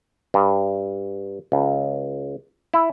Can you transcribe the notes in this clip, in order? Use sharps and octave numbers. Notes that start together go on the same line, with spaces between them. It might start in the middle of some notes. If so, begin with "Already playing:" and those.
G2
C#2
E4